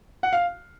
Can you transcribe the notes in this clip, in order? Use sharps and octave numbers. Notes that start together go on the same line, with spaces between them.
F#5
F5